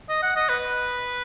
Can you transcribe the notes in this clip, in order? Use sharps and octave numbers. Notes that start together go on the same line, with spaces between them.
D#5
F#5
D#5
B4